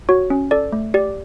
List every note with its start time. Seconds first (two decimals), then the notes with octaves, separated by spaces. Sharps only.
0.09 F#4 C#5
0.30 C#4
0.51 A4 D5
0.72 A3
0.94 G4 D5